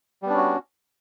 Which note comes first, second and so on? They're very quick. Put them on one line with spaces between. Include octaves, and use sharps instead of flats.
G3 B3 D4 C#4 F#4